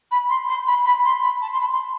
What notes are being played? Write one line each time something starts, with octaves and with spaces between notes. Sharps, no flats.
B5
C6
C6
B5
B5
C6
B5
A5
C6
B5
C6